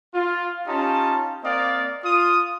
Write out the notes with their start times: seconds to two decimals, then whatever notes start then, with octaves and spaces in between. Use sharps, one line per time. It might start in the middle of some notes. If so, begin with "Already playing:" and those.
0.14 F4
0.67 C#4 D#4 F4 G4 A5
1.44 A#3 C4 D5 D#5 F5
2.04 F4 D#6